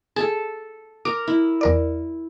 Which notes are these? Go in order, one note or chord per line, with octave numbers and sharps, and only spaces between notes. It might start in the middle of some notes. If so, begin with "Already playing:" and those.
G#4 A4 A5
A#4 D6
E4
E2 A#4 D5